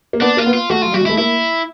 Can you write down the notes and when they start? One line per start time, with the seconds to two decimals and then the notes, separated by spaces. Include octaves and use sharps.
0.13 A#3
0.21 B3 D4
0.37 A#3 F4
0.46 B3
0.54 F4
0.70 A3 F#4
0.82 F#3 F4
0.92 G3 F#4
1.01 G#3
1.06 E4
1.09 A3
1.18 A#3 E4